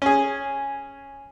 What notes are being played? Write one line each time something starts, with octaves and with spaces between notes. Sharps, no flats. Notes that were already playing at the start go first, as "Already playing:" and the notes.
C#4 G#4